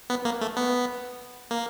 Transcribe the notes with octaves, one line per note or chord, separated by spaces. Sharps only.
B3
A#3
A3
B3
A#3